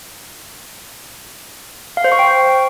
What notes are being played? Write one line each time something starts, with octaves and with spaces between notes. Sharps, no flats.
F5
C5
C#6
G5